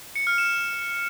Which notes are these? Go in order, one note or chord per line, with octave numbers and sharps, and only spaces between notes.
C#7
F6
E7